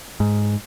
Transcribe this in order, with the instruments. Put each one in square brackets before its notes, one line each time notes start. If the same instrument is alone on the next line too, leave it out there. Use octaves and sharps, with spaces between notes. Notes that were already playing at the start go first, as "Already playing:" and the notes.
[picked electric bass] G#2